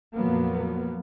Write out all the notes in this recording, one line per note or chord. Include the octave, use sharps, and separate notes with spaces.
F2 A#2 F3 F#3 A#3 B3